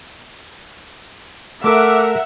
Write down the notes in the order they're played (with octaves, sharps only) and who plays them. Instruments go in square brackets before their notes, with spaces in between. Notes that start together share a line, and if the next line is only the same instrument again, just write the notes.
[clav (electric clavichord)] A3 A4 [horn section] A#4 [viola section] E5 F#5 [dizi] D6